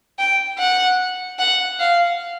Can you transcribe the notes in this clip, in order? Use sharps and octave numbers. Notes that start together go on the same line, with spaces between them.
G5
F#5
F#5
F5